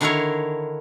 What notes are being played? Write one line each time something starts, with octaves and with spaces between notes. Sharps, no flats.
D3 D#3 D4 E4 A#4 C#5